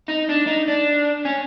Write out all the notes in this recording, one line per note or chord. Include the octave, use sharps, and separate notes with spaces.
D#4
D4
D#4
D4
C#4